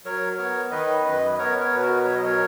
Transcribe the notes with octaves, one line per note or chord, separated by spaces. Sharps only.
F#3 A#4 C#5
B3 A#4 C#5
D#3 B4 D#5
F#2 B4 D#5
B3 A#4 C#5
A#4 C#5
B2 B4
F#4 A#4
F#3 C#5
D#5
A#4 C#5